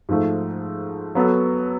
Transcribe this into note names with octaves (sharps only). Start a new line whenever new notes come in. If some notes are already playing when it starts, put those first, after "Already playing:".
G#2 F3 A3
F#3 B3 F#4 A4